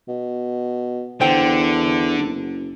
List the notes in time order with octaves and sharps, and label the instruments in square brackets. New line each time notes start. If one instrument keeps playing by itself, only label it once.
[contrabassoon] B2
[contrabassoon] E2 [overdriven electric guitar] D3 [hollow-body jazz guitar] C5 G5
[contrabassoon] F#1